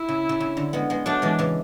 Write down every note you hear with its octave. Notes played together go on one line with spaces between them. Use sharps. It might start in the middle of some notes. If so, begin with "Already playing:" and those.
Already playing: E4
C#3
C#3
C#3
D3
G#3 B3
G#3 B3
F#3 A3 D4
E3 G#3
C#3 E3